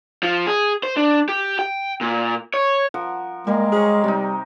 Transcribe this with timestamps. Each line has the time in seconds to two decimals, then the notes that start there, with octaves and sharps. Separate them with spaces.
0.23 F3
0.47 G#4
0.83 C5
0.97 D4
1.29 G4
1.59 G5
2.01 A#2
2.54 C#5
2.94 F3 A#4 F#5
3.47 G3 G#3 A#3 A#4 A#5
3.72 G#4 A#4 C5 C#5
4.04 C3 G3 D#4